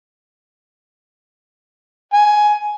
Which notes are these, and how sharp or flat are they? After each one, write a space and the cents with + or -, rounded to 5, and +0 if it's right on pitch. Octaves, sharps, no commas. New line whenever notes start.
G#5 +10